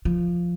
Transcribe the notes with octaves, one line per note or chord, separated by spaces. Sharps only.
F3